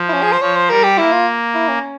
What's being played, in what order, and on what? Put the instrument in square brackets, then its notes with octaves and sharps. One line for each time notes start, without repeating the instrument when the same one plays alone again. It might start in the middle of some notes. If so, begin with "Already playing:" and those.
Already playing: [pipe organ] F3
[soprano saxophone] E4
C#4
G#4
C5
[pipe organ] F3 [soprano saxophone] C#5
[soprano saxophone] C5
[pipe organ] G3 [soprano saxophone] A#4
[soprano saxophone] G4
[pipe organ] A#3 [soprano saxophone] E4
[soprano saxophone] F4
E4
C#4